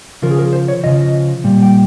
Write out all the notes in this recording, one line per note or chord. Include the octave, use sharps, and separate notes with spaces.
C#3 F3 A#4
G#4
A#4
C5
C#5
C#3 F3 D#5
A#2 G3
G5